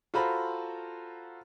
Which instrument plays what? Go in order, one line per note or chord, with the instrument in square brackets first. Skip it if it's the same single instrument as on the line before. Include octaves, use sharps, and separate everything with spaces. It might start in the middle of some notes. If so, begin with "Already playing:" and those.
[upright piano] F4 F#4 A4 C5 A#5 B5